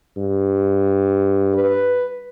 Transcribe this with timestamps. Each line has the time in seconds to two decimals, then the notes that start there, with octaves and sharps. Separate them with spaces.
0.17 G2
1.54 B4